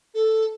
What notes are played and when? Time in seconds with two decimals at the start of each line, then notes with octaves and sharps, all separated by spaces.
0.15 A4